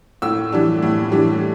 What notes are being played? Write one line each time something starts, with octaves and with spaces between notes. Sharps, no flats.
A2 E6
E3 G3 D4
A2
E3 G3 D4